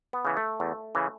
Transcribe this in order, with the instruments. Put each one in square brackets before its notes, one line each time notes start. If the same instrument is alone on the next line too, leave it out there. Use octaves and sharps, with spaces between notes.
[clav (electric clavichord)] B3
C#3 E3
A3
E2
C#3 E3